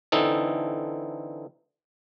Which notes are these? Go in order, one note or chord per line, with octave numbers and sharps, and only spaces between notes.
D3 E3 C4 D#4 A4